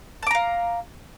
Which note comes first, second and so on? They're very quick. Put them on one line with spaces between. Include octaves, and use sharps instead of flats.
A5 D6 A#5 F5